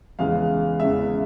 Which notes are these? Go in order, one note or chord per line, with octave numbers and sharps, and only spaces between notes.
E2 C#3 E3 G#3 F5
E2 C#3 E3 G#3 E5